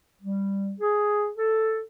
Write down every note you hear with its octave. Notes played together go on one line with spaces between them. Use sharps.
G3
G#4
A4